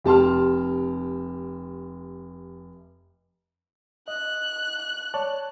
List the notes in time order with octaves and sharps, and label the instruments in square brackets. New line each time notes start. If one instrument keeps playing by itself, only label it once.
[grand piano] F1 G4 A5 C6 F6
[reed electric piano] D#5 [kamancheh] F#6
[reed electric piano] C#5 D5 A5